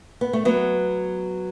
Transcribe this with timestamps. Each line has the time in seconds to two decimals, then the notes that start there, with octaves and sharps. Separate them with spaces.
0.21 B3
0.33 A3
0.45 F#3 B3